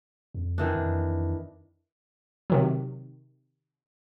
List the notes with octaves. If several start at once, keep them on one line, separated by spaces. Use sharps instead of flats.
F2
D#3 E3 D4
F2
C3 D#3 F#3